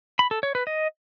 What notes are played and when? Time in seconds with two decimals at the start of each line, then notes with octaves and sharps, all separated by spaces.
0.19 B5
0.31 A4
0.43 C#5
0.55 B4
0.67 D#5